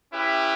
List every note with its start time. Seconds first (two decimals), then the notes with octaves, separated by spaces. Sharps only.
0.12 C#4 E4 G4 B4